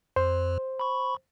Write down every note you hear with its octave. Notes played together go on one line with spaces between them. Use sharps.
F2 C5
B5 C#6